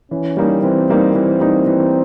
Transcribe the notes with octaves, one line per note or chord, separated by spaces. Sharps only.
E3 C#4
G3 A#3 D#4
E3 C4
G3 A#3 D#4
E3 C4
G3 A#3 D#4
E3